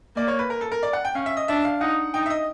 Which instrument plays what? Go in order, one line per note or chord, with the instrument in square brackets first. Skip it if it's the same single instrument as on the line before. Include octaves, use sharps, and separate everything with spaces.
[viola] A#3 [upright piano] D5
[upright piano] C#5
B4
A#4
A4
A#4
D5
F#5
G5
[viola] C#4 [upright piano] F5
[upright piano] E5
D#5
[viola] D4 [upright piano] E5
[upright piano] F5
[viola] D#4 [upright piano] F#5
[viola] D#4 [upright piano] G5
[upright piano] E5
D#5